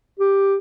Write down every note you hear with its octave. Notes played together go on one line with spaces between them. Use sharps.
G4